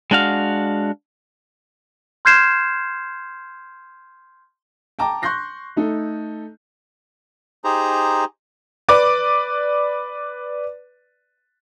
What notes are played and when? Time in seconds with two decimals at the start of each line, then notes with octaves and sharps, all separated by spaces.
0.11 G#3 D4 F#4 F5
2.25 C6 F6 G6 G#6 C7 E7
4.99 G5 A5 A#5 D6
5.22 C6 C#6 F#6 G6 A#6 C7
5.77 A3 D#4 A4
7.64 D#4 G4 G#4 C5 A#5
8.88 B4 D5 D6